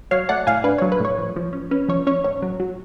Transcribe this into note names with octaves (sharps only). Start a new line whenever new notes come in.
F#3 C#5 F5
A3 D5 F#5
A2 F5 G#5
D4 B4
F#3 C#5
B4
A2 C#5
F3
F3
C#4
C#4 B4
F3 C#5
C#4 C#5
A2 C#5
F#3
F#3